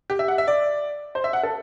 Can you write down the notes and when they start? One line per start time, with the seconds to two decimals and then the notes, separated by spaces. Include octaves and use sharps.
0.10 G4
0.19 E5
0.28 F#5
0.38 E5
0.48 D5
1.15 C5
1.24 E5
1.33 F#5
1.43 A4